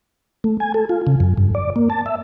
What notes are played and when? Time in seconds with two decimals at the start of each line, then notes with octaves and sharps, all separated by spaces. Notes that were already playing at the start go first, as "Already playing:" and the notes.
0.44 A3
0.60 G#5
0.74 A4
0.89 F4
1.07 C#3
1.20 F#2
1.38 G2
1.55 D5
1.76 A#3
1.90 A5
2.06 E5